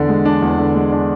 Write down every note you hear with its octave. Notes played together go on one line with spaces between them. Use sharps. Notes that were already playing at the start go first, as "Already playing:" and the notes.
Already playing: E2 D3 D4 D5
G#3
D4
E2
D3
G#3
D4